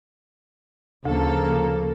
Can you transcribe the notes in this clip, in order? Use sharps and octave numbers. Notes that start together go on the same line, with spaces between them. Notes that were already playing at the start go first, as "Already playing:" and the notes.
D2 C#3 F3 A#3 A4